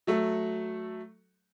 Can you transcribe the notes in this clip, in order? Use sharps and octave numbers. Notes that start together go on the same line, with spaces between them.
F#3 A3 A4